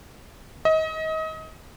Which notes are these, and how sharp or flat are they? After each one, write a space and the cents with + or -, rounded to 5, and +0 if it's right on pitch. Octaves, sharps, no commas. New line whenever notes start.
D#5 +30